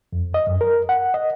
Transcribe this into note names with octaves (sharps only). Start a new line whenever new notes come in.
F2
D#5
F#2
A#4
F#5
D#5